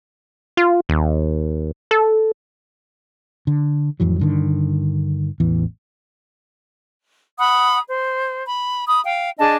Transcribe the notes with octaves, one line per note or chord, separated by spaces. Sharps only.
F4
D#2
A4
D3
A1 F2 E3 F#3
G2 D3 D#3
A1 E2 E3
F#5 B5 D#6
C5
B5
B5 D#6
F5 G5
D4 G#4 D#5 A5